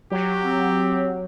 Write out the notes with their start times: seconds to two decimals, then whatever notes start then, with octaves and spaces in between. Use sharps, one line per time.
0.11 F#3 G4
0.43 C4